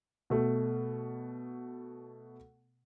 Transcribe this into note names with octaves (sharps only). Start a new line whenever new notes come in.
B2 A3